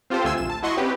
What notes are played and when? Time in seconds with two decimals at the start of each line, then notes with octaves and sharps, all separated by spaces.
0.10 C4 F4 G4 A4 C5
0.24 D2 A3 F4 G#5 C6 E6
0.38 A#1 E7
0.50 A5
0.63 E4 F#4 D#5 C6 C#6
0.77 C4 C#4 G4 B4